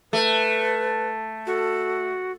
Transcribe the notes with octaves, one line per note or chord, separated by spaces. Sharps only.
A3 B4
F#4 A4